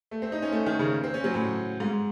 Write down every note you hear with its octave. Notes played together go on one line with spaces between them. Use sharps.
A3
C4
D#4
C#4
A3
D#3
C#3
C4
C#4
F#3
A2
G#2